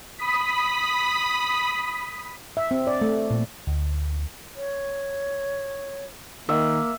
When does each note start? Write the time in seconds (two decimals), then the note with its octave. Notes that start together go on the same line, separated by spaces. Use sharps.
0.19 B5 D#6 B6
2.57 E5
2.71 C4
2.87 D5
3.01 A3
3.30 A#2
3.67 D2
4.56 C#5
6.49 D#3 A#3 E5